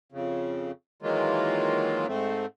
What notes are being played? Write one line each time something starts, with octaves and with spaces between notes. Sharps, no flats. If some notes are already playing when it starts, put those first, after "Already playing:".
F2 C#3
D#3 E3 F#3 G#3 A#3 F4
G#2 A3 C4